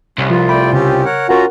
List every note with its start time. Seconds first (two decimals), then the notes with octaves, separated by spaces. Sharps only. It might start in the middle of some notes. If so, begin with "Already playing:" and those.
0.18 C2 C#4
0.30 F3 F4 B4
0.49 A3 D5 G5 B5
0.73 C#3 C4 C#4 G4
1.05 A#4 C#5 F#5
1.29 C#4 F4 F#4 A#4 F#5 A#5